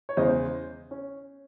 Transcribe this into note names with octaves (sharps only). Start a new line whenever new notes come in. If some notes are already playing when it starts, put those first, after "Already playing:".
C#5
E2 C#3 G#3 C5 D#5
C#4